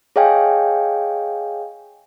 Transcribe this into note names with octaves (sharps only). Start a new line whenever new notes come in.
G#4 C#5 D#5 F5 G5 G#5